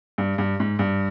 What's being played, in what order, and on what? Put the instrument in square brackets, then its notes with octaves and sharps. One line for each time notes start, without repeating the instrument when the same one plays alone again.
[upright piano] G2
G2
G#2
G2